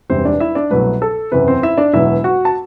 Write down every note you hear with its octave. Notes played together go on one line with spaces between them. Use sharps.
E1 E2 C3 G3 C4 C5
D4 D5
E4 E5
D4 D5
C2 B2 F#3 A3 B4
A4
F#1 E2 C3 B4
C4 C5
E4 E5
D4 D5
E1 E2 B2 F#3 E4 E5
F#4 F#5
A5